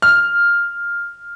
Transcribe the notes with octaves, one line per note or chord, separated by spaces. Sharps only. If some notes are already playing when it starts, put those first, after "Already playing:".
F6